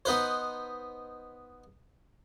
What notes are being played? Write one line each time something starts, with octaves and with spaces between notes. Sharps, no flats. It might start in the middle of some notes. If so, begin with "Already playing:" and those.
B3 D#4 B4 C5